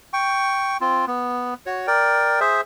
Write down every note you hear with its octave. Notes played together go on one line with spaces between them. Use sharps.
G5 C#6
C4 F4
B3
F#4 C#5
A#4 D5 G5
G#4 C5 E5